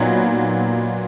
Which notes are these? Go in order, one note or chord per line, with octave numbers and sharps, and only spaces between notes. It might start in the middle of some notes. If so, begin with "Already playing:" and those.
Already playing: A#2 F#3 B3 D#4